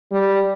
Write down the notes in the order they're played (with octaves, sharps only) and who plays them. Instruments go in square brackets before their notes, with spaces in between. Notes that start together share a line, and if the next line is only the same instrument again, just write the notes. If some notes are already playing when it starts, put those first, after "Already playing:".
[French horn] G3